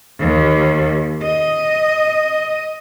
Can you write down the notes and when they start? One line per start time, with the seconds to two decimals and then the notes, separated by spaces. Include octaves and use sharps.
0.20 D#2
1.23 D#5